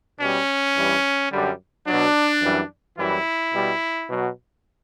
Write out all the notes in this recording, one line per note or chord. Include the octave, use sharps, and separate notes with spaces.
B2 G3 C#4
G2 E3 G3
F#2 D3 G3
B2 F#3 D4
F#2 E3 G3
F#2 E3 G3 E4
B2 G3
B2 F#3